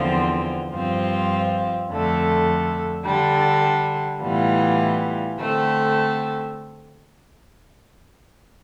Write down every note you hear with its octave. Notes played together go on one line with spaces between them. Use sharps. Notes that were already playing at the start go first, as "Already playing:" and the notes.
Already playing: E2 D3 F3 C4 F4
G2 F3 C4 F4
F2 D3 A3
D3 G3 D4
A2 E3 G3 B3 F4
D3 A3 C4